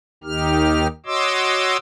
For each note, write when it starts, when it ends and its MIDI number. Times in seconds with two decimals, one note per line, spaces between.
0.24 0.87 39
0.24 0.87 51
0.24 0.87 63
0.24 0.87 67
0.24 0.87 89
1.06 1.77 66
1.06 1.77 73
1.06 1.77 75
1.06 1.77 84
1.06 1.77 86
1.06 1.77 88